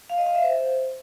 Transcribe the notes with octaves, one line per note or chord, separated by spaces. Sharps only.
F5
D#5
F5
E5
C5